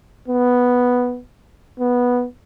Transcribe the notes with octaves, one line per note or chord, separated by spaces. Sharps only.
B3
B3